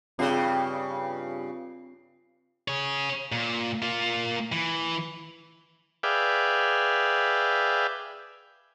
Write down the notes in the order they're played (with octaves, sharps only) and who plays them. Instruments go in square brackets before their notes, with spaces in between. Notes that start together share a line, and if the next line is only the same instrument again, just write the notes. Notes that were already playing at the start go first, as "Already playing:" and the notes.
[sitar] G2 C#3 [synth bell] C4 F4 C7
[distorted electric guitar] G#4 C#5
A#2
A#3 F4
E3
[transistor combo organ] G#4 B4 D5 E5 F5 G5